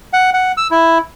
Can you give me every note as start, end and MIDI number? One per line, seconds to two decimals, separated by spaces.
0.13 0.30 78
0.34 0.52 78
0.57 0.67 88
0.71 0.98 64